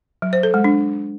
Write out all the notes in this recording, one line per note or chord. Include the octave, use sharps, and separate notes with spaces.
F#3
C5
A4
G#3
D4